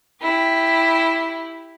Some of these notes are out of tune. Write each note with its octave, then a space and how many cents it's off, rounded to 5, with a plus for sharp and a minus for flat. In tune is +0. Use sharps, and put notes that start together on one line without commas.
E4 +0 G4 +0